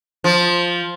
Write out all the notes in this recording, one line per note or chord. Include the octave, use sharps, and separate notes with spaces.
F3